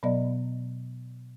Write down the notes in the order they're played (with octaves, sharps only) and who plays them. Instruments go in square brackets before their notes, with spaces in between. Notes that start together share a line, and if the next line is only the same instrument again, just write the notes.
[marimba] B2 F#3 B3 D5 D#5